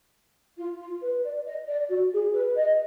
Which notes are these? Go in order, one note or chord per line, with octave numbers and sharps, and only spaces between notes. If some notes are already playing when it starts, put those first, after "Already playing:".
F4
F4
B4
D5
D#5
D5
F#4
G#4
B4
D#5